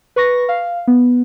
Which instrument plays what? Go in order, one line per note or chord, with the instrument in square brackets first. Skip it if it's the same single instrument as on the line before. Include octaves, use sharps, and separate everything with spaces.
[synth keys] B4 C#6 A#6
F5
B3